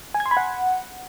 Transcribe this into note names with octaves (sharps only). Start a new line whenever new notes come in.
G#5
G#6
C6
B5
F#5